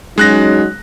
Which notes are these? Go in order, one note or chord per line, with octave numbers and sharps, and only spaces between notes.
F#3 G#3 C#4 D#4 F#6 A#6